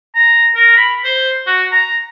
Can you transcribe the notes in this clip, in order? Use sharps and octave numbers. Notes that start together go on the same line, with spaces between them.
A#5
A#4
B5
C5
F#4
A#5